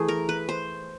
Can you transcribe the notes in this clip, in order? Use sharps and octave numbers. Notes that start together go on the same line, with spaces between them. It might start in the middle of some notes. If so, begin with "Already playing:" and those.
Already playing: E3 A3 G#4
A#4
B4
C5